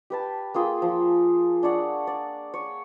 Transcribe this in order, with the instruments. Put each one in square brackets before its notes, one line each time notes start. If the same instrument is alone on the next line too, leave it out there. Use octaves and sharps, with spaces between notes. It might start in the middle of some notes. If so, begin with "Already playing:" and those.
[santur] G4 B4 A5
A#3 F4 G#4 G5
F3
D4 C#5 D5 F#5
D5
C#5